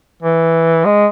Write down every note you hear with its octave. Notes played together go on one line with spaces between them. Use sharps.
E3
G#3